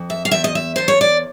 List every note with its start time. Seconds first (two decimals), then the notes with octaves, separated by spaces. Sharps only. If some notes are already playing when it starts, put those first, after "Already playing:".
Already playing: F2
0.10 E5
0.25 F5
0.31 E2 E5
0.44 D#5
0.55 E5
0.76 E2 C5
0.88 C#5
1.01 D5